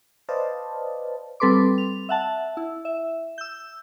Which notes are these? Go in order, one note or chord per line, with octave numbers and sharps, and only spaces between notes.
B4 C5 D5 D#5 F5 A5
G3 C4 A4 B4 C6 D6
F7
E5 F#5 A5
E4
E5
E6 G6